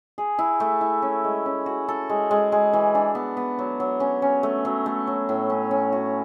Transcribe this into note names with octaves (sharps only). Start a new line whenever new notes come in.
G#4
E4
A3
E4
C#4
G#3
C#4
F#4
A4
G#3
G#3
G#3
E3
D4
B3
B3
F#3
F#3
C#4
C#4
A3
F#3
A3
F#3
A2
C#4
C#4
F#4